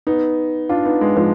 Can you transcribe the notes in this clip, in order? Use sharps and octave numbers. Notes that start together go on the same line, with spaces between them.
B3 D#4
D4 F4
B3 D#4
G#3 B3
F3 G#3